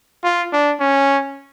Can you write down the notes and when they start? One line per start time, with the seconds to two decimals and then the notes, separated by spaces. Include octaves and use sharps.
0.24 F4
0.52 D4
0.80 C#4